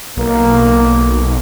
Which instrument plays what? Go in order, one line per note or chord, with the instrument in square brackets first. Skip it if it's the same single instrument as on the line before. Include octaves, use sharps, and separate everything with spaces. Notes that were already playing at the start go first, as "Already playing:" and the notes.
[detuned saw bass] B1 [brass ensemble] A#3